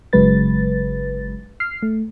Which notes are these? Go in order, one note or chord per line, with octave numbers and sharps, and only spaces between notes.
G1 C#3 F#3 G#3 B4 A6
F6 C7
A3